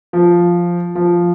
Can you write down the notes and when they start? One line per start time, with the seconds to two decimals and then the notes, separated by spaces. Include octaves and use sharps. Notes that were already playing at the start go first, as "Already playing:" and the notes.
0.13 F3
0.95 F3